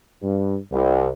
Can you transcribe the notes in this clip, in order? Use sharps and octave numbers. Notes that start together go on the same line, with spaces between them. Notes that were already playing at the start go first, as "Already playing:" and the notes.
G2
C2